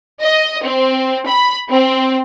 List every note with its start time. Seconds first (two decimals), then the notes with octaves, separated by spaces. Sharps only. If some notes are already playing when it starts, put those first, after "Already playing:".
0.22 D#5
0.64 C4
1.29 B5
1.71 C4